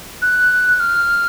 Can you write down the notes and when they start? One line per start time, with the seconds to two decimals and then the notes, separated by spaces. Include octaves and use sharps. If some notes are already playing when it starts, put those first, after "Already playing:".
0.22 F#6
0.80 F6